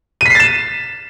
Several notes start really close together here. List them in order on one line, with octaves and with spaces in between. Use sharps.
D#7 B6 C7 A6 E7